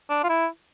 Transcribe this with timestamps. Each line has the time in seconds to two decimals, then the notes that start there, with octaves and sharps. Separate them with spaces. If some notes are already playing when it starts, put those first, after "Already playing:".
0.10 D4
0.24 F4
0.29 E4